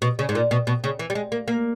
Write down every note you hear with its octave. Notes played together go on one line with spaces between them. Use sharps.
B2
C#3
G#2
A#2
B2
B2
C#3
E3
G3
G#3
A#3
A#3